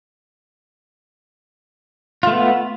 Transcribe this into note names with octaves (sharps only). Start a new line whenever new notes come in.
A3 B3 F4